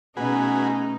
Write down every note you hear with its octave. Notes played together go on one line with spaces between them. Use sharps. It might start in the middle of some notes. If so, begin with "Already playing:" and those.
B2 A3 C#4 D#4 F#4 G#4 B4